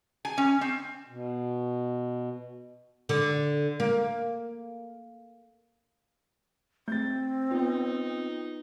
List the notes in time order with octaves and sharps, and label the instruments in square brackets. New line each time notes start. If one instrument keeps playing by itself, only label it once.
[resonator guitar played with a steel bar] G#5
C#4
C4
[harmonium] B2
[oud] D3
A#3
[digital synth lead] A3 [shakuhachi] C4 [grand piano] G6 A6
[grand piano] B3 [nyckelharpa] D#4 [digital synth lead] F4